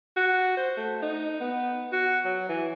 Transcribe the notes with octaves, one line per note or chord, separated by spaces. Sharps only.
F#4
C5
A3
D#4
B3
F#4
F#3
E3